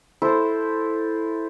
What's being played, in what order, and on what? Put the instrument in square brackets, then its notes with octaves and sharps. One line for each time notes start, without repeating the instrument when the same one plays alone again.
[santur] E4 A4 C5